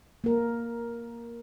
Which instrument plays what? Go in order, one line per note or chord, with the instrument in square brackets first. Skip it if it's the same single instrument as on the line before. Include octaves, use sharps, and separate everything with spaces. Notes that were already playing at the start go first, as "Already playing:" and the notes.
[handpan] A#3 A#4